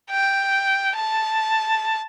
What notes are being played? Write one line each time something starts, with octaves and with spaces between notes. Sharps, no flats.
G5
A5